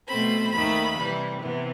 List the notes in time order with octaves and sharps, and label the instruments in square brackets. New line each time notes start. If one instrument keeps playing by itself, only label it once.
[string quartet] B2 A3 C4 B5
D#2 D#3 A3 B5
C3 E3 G3
C3 E3 B3